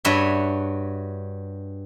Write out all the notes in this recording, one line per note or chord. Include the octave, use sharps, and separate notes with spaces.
G2 F#4 C#5 E5